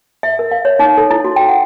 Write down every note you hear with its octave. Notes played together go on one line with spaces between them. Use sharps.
E5
A#4
F5
C#5
D#4
A4
E4
F#4
G5
F#5